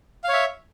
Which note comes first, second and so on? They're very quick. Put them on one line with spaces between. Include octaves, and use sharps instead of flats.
F5 C#5 E5